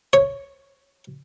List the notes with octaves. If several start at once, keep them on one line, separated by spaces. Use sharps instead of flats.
C#5